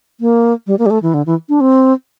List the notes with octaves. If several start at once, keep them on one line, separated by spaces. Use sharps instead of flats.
A#3
G3
A#3
G3
A3
E3
D3
E3
D4
C4